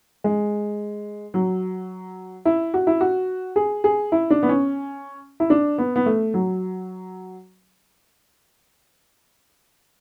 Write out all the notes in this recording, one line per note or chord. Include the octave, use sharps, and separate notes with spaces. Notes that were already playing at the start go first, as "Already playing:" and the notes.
G#3
F#3
E4
F#4
E4
F#4
G#4
G#4
E4
D4
B3
C#4
E4
D4
B3
B3
A3
F#3